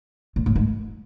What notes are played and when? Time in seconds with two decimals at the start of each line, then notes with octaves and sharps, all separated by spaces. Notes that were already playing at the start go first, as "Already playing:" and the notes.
0.36 A#2
0.46 A2
0.56 G#2